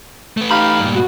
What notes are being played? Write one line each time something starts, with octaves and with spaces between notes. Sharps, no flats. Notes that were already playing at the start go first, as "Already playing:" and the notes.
A3 B4
D#4 G4 F5 B5
G2 A#2
B2 F#4